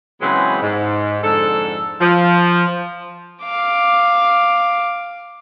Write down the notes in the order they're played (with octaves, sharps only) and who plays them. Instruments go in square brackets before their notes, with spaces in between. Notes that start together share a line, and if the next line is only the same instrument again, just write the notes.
[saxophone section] C#3 E3 F#3 G#3 B3 C4
G#2
F2 G#2 D3 A4
F3
[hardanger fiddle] F5 D6